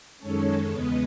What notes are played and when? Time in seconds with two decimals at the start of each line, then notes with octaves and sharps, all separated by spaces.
0.19 F#2 D#3 G#3 C#4 A4 C#5
0.70 E2 C#3 G#3 B3 B4 D#5